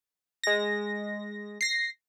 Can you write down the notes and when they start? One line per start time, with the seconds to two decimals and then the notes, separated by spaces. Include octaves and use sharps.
0.44 G#3 A#6
1.61 A#6 C7